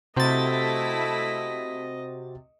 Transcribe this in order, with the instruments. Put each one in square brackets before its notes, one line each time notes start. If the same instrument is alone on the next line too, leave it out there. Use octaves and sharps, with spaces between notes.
[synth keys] C3 A6 [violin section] A3 E4 B6 [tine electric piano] F#4 C5 [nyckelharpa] D#5